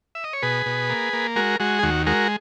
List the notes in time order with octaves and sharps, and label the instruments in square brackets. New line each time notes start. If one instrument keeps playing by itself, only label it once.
[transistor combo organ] E5
D#5
C#5
B2 G#4 B4
B2
A#3
A#3
G#3 F#4 A#4
G#3 F#4
G#4
D#2 F#4
G#3 F#4 A#4